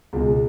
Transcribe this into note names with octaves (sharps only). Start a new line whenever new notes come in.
C#2 B2 G#3